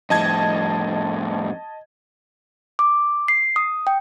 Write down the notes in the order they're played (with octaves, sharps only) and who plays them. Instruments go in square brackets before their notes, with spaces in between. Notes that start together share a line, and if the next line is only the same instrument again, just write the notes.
[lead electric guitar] F2 A2 [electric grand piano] D#5 A5 G#6
[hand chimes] D6
C7
D#6
G5